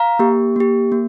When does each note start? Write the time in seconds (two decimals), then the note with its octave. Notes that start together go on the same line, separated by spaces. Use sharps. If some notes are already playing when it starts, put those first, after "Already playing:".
Already playing: F5 A#5
0.19 A#3 G4
0.56 A#3 G4
0.92 A#3